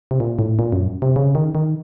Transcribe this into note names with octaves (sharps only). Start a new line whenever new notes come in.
C3
A#2
A2
A#2
F#2
C3
C#3
D#3
D#3